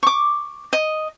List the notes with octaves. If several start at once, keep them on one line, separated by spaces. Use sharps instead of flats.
C#6 D6
D#5